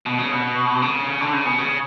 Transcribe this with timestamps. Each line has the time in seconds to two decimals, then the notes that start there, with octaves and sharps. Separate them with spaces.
0.06 B2
0.19 C#3
0.32 B2
0.82 C#3
1.21 D3
1.33 C#3
1.45 B2
1.59 C#3